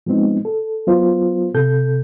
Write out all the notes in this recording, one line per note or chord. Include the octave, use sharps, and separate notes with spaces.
F3 G#3 B3 C4 D#4
A4
F#3 B3 F4 C5
C3 A4 G6